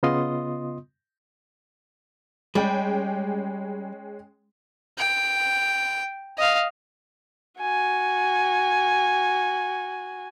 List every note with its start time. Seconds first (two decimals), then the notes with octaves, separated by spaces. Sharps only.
0.03 C#3 B3 F4 D#5 C6 D#6
2.55 G3 G#3 C#4 G5
4.98 G5
6.38 D#5 F5
7.61 F#4 G#5